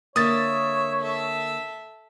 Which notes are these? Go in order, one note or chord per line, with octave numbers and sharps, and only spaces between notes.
D3 A#3 C#5 E5 D#6 A6
A4 E5